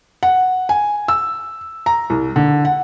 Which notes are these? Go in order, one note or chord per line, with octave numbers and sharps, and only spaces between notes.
F#5
G#5
E6
A#5
C2
D3
F#5